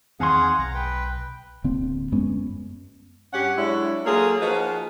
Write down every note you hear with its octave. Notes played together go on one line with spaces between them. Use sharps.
E2 D#3 C4 G#4 F5 F#5 G#5 C6
B1 A#5
B4 G5
D1 D3 A#3 C4
F#2 G#3 B3 C#4
G2 C#4 G4 F#5
F#3 G#3 D4 E4 C#5
F#3 A#3 F4 G#4 A4 B4
F3 A#3 D#4 F#4 G#4 B4